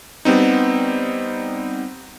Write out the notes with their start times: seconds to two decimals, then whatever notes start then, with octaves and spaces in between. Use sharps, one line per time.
0.25 G3 B3 C4 D#4